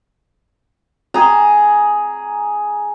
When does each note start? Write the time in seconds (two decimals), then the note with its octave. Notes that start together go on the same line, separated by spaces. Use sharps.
1.14 G#4 A#5